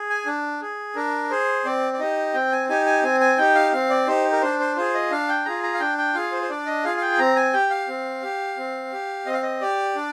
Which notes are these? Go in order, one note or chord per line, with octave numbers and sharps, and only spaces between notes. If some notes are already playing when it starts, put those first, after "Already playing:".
Already playing: G#4
G#5
D4
G#4
D4 A#4
G#4 C5
C4 D5
D5
D#4 G4 D#5
C4 G5
G#5
D#4 G4 G#5
G#5
C4 G#5
G#5
D#4 G4 G5
F5
C4 F5
D5
D#4 G4 C5
A#4
D4 C5
C5
F4 G#4 C5
D#5
D4 F5
G5
F4 G#4 A#5
A#5
F5
D4 G5
G5
F4 G#4 F5
C5
C5
D4 D5
D#5
F4 G#4 F5
F5
G5
C4 A#5
G#5
G4 G5
F5
C4
G4
C4
G4
C4 D#5
F5
D#5
G4 D5
D4